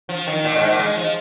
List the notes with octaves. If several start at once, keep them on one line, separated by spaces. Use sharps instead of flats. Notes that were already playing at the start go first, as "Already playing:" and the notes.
F3
D#3
A#2
G#2
A#2
G#3
F3